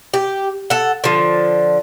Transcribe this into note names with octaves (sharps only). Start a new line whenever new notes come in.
G4
A4 F#5
D3 F3